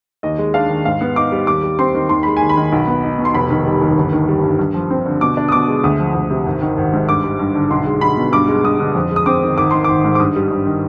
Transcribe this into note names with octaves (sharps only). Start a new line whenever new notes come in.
D#2 D#5
G#3
D4 F5
D#3
G#2 F5
B3
D#4 D6
G3
D#2 D6
G3
C4 C6
D#3
D#2 C6
G#3 B5
D#2 G#5
B5
D#3
B1
B3
D#4
B2
C6
F1 B5
D#3
G3
D#2
G1
D#3
G3
G2
G2
F3
C4
D3
B2 D6
D4
D#6
B2 D6
G#3
D2 D#6
F3
D2
C3
G#1
D#3
G#1
G#2
G2 D6
G3
G2
D3
B1 C6
G#3
B1 B5
B2
G2 D6
G#3
G2 D#6
D3
F2
G#3
D#6
C4 D6
D#3
G#1 D6
D#3 C6
G#1 D6
G#2
D6
G2 D#6
G3
G2
D#3